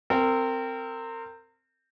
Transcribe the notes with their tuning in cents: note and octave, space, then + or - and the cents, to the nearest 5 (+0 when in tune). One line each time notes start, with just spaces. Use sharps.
C4 +0 A#4 -30